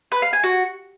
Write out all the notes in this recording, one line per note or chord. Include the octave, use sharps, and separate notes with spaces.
B4
F5
G#5
F#4